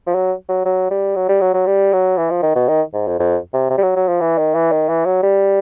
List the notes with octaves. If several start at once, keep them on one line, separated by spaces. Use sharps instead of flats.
F3
F#3
F#3
F#3
G3
F#3
G3
F#3
F#3
G3
F#3
E3
F3
D#3
B2
D#3
G#2
F2
F2
C3
C3
G3
F#3
F#3
F3
E3
D#3
E3
D#3
E3
F#3
G3